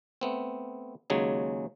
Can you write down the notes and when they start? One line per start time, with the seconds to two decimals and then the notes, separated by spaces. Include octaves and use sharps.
0.21 A3 B3 C4
1.10 D#2 C#3 F#3 G#3 G#4